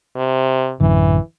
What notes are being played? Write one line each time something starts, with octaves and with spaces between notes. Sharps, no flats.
C3
A1 F#2 D3 E3